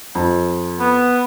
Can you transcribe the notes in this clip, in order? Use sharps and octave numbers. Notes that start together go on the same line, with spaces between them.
F2
B3